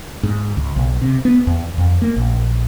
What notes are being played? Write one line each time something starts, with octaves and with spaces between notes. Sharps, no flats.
G#2
C#2
B1
C3
B3
E2
F2
A#3
A#1